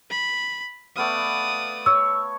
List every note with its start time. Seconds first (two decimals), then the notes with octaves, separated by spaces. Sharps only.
0.10 B5
0.96 A3 B3 D5 F5 D#6
1.86 C#5 E6